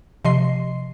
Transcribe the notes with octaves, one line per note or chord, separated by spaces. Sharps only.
C3 F3 D#5 C6 C7